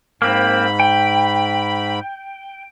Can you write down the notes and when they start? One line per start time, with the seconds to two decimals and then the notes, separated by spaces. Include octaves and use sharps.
0.22 G#2 A#3 C4 B5
0.80 G5